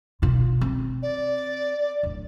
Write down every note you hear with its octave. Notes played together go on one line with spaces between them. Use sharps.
B2 F4
C4
D5
D1